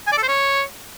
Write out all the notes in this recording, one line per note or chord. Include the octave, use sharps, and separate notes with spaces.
G#5
D5
A4
C5
C#5